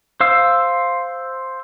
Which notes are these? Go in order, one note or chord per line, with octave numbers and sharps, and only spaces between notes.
C5 F5 E6